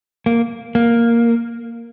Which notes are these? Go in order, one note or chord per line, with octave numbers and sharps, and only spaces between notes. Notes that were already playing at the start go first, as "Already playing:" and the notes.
A#3
A#3